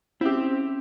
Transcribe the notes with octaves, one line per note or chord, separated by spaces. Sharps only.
C4 C#4 E4 G4 E5